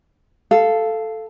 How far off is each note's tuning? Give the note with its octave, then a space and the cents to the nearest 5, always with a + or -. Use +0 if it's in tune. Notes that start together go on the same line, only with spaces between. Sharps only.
A4 +0 F5 -10